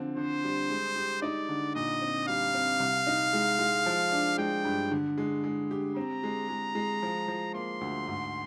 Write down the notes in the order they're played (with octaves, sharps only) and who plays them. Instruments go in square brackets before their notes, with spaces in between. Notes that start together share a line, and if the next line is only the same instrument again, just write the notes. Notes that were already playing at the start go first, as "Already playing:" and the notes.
Already playing: [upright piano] D3 F3 C4
[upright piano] D3 [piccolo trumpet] C5
[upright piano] G3
G#3
G4
[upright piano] D#4 [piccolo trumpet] D5
[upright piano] D3
[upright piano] A#2 [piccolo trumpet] D#5
[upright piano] C4
[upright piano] G3 [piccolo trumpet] F5
[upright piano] C4
C2
D#4
G#3
G#3
F3
D4
[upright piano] G#3 [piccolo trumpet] G5
[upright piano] G2
D3
G#3
G#3
G4
[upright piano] C4 [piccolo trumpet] A#5
[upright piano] G#3
G#3
G#3
F3
F3
[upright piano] A#3 [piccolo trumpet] C6
[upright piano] D2
G#2